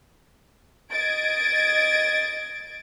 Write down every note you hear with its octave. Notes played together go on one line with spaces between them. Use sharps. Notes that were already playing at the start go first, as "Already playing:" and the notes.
D#5 G#6 A6 D7